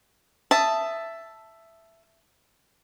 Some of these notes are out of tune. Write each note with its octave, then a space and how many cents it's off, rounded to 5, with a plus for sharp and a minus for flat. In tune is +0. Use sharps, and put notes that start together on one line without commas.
E5 +10 A5 +0 D#6 +0